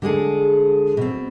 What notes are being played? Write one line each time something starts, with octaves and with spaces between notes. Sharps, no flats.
D3 G#3 G#4 A4
B2 C4